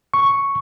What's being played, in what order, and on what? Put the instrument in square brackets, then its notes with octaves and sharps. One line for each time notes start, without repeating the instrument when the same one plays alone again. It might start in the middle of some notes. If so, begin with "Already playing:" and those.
[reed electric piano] C#6